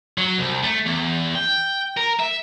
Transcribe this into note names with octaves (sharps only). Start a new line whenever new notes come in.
F#3
C2
A3
E2
G5
A#4
E5